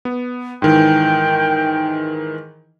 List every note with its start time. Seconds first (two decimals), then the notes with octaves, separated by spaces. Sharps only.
0.05 B3
0.62 G#2 D#3 E3 G5